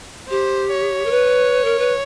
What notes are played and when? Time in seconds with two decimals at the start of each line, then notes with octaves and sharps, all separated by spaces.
0.29 G4 C5
0.71 C#5
1.06 A#4
1.11 B4
1.65 A#4
1.79 B4